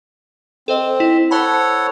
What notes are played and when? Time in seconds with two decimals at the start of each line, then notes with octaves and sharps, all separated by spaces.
0.68 C4 A4 C5 D#5
1.00 E4
1.31 A4 C5 C#5 F#5 A5 B5